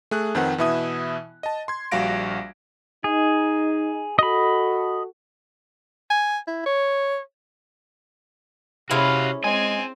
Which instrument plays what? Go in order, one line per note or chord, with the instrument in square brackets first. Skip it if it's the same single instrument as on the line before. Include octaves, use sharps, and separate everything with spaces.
[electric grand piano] A3 G#4 F#6
F2 D#3 C4 B4 F#5
B2 E3 E4 E5 D#6
D#5 A5
C6 G#6
A#1 G3 F#4 F5 A#6 D7
[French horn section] D#4 [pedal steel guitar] G#4
[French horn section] F#4 A4 [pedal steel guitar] D#5 B5
[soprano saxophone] G#5
E4
C#5
[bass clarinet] C3 [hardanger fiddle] C#4 [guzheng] E4 G#4 C5 [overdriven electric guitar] F#4 F5
[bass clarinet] G#3 [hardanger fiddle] C4 [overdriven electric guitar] G#5